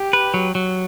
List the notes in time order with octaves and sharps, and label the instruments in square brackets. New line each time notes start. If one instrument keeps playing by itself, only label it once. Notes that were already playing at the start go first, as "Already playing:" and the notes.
Already playing: [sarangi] G4
[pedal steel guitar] B4
F#3
F#3